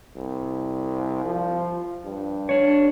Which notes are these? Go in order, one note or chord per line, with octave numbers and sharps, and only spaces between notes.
C2
F3
G2
D4 C#5